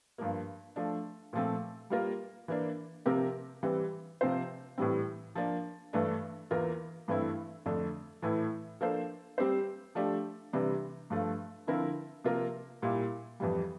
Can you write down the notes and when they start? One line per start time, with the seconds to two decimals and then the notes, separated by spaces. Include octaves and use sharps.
0.18 G2 F3 A#3
0.76 F3 A3 D4
1.33 A#2 F3 A3 C4
1.90 G3 A#3 F4 A#4
2.48 E3 A#3 D4
3.06 C3 F3 C4 G4 A#4
3.63 E3 G3 C4
4.21 C3 F3 C4 F4 C5
4.78 A2 E3 G3 C4
5.35 F3 A#3 D4
5.93 G2 E3 A3 D4
6.51 E2 E3 A#3 F4 A#4
7.08 G2 E3 A3 C4 E4
7.66 F2 D3 A3 D4 A4
8.22 A2 E3 A3 E4
8.81 F3 A#3 D4 A4 C5
9.38 G3 C4 G4 C5
9.95 F3 A3 D4 G4
10.53 C3 E3 G3 D4
11.10 G2 F3 A3
11.67 D3 F3 C4 E4 A#4
12.24 C3 F3 A#3 F4 A#4
12.82 A#2 G3 A#3 E4
13.40 F2 E3 G3